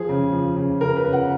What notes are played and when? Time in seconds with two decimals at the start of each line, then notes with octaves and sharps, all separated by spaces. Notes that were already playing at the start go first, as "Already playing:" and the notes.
Already playing: F3 G#4
0.09 C#3
0.32 F3
0.56 C#3
0.81 C#3 A#4
0.96 B4
1.04 C#3
1.13 F#5